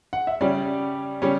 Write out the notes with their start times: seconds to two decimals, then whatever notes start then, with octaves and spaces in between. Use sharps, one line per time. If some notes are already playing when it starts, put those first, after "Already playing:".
0.13 F#5
0.27 E5
0.41 C#3 G3 C#4 D5
1.22 C#3 G3 C#4